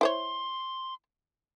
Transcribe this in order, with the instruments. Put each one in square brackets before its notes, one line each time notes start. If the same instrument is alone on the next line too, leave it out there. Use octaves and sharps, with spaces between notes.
[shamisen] E4 C5 C#5 [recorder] C6